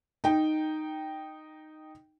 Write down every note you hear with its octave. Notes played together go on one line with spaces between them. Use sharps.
D#4 G5